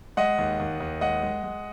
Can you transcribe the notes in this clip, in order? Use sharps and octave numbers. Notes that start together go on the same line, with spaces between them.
G#3 D#5 F#5
D#2
D#2
D#2
G#3 D#5 F#5
G#3
G#3